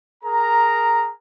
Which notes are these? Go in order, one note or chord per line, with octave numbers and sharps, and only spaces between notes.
G#4 A#4 A#5